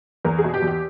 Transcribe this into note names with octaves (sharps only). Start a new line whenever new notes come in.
E2 A#4
G#4
B2
G4
E2
G4